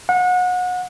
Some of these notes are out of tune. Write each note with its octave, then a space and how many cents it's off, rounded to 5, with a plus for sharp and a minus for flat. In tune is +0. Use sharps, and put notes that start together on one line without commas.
F#5 -30